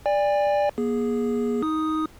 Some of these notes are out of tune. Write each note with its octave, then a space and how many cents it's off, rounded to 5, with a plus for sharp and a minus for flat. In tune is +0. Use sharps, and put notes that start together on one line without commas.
D5 +0 G#5 -40
A#3 +40 G#4 +0
D#4 +15 D#6 +0